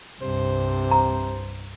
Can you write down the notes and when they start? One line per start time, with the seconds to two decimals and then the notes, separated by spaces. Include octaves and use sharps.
0.21 C2 G2 C3 C5
0.91 A#5